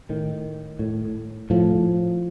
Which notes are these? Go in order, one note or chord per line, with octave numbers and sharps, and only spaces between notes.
A2 D#3
A2
A2 F3